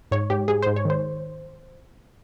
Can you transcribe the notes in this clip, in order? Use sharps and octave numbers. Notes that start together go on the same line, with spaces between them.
G#2 C#5
G#2 G4
G#2 G#4
G#2 C5
C#5
D#3 C5